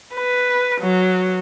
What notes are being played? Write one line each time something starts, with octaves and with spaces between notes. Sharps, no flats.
B4
F#3